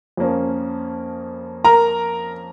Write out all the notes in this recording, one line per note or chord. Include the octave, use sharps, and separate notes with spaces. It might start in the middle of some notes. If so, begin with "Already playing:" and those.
F2 F3 A#3 C#4
A#4 A#5